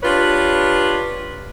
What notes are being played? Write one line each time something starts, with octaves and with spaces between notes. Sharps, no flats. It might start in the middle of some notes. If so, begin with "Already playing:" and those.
D4 F4 G4 B4 C#5